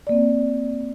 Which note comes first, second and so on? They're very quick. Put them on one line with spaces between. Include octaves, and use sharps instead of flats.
D5 A#3 C4